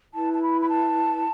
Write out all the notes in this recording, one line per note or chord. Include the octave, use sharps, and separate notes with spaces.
E4 B4 A5
A5
B5
B5
A5